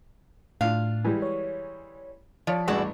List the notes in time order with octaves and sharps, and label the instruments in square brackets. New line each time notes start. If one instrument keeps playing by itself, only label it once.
[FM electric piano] A2 [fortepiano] D4 F4 [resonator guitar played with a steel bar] F5
[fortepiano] E3 G3 G#3
[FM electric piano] C#5
[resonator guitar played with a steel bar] F3 [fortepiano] C#5 D5
[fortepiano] A1 E2 G2 [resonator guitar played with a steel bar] E4 F#4 D5 [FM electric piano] G#4